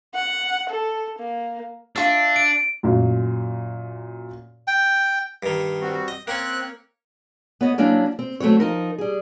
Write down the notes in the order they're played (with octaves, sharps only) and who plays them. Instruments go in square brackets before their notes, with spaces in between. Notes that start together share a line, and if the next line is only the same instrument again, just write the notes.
[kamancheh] F#5
A4
A#3
[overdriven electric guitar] D4 [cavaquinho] F4 F#4 E5
[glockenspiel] D7
[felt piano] F#2 A#2
[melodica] G5
[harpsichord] G2 D#3
[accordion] G3 C4 F#4
[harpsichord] D#5
[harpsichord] A#3 C#4 G#5 [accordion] C4 F#6
[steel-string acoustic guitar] B3 C#5 D#5
F#3 A#3 C#4 D4 E4
C4
F#3 A3 C4 F#4 C#5
F3 D#4 A#4
G3 G#4